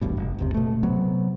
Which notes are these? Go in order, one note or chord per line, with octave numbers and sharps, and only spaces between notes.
D#1 A1 G2 B2
F1
F#1 D2 C3
B2 A3
C3 F#3 B3